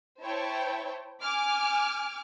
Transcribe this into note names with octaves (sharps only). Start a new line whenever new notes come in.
E4 C5 C#5 G5 A5
G#5 D6 F6